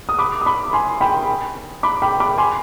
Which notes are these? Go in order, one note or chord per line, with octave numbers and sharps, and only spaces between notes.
D#6
B5 D6
D#6
B5 D6
G#5 C6
G5 B5
B5 D6
G5 B5
B5 D6
G#5 C6